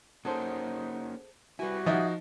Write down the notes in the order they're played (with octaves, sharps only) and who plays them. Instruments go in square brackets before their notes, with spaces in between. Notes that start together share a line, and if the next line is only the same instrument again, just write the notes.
[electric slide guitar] A#3 C#4 F#4 [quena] D#4 [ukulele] G#4 A4 C5
[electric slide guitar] G3 E4 [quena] F#4 [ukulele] B4 G#5
[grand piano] F3 D#4 [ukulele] G#4 E5 F#5